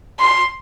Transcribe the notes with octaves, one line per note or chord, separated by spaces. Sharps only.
C6